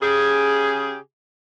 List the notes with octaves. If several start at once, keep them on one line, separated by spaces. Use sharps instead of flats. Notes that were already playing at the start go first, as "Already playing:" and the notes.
C#3 G4 G#4